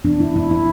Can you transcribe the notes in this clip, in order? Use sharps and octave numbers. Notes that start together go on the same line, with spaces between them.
E3 B3 D4
E4
E4
E4